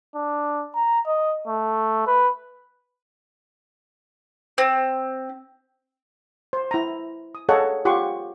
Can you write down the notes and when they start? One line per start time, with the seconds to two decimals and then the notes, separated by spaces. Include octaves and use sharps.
0.15 D4
0.75 A#5
1.07 D#5
1.48 A3
2.07 B4
4.58 C4
6.53 C5
6.71 E4 A#5
7.35 D#6
7.49 G#4 A4 C#5 D#5 F5 F#5
7.85 F4 G4 F#5 C6 C#6